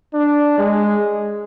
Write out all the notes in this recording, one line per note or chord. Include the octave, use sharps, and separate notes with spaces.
D4
G#3